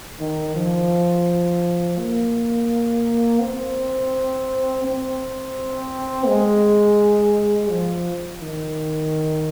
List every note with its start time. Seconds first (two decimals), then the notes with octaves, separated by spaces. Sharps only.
0.20 D#3
0.55 F3
1.98 A#3
3.41 C4
4.84 C4
6.27 G#3
7.71 F3
8.42 D#3